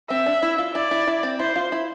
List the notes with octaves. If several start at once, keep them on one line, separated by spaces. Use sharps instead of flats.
C4 E5
D4
E4
F4
E4 D5
E4
E4
C4
E4 C5
F4
E4